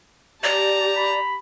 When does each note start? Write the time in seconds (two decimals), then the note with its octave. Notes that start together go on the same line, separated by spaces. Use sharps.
0.44 G4 D5 A5 A#5
0.96 B5